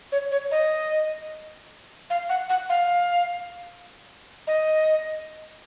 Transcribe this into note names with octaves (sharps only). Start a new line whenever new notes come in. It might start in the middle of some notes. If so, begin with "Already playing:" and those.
C#5
C#5
D#5
F5
F#5
F#5
F5
D#5